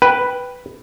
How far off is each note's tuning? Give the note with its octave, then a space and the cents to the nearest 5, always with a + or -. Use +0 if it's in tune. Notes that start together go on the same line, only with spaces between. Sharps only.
B4 +0 G5 +0